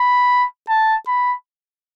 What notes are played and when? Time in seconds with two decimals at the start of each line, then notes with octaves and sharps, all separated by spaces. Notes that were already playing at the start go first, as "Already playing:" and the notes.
Already playing: B5
0.69 A5
1.07 B5